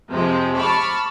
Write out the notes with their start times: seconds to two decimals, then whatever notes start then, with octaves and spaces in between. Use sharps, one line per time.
0.10 F2 C3 F3 G#3
0.57 A5 B5 C#6 D6 F6